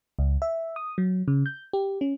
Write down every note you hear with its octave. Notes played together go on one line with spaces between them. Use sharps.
C#2
E5
D#6
F#3
C#3
G6
G4
C#4